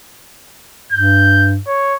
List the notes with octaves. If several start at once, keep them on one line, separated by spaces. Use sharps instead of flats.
G2 G6
C#5